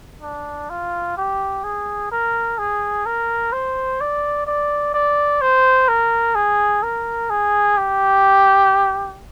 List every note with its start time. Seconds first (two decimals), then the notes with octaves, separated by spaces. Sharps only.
0.22 D4
0.70 F4
1.17 G4
1.64 G#4
2.12 A#4
2.59 G#4
3.06 A#4
3.53 C5
4.01 D5
4.47 D5
4.94 D5
5.42 C5
5.88 A#4
6.36 G#4
6.83 A#4
7.30 G#4
7.77 G4